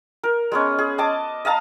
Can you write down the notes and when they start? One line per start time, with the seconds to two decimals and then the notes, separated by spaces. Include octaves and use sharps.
0.23 A#4
0.52 G#3 B3 C#4
0.78 G#4
0.98 D#5 A5 D6
1.45 D#5 F5 A5 A#5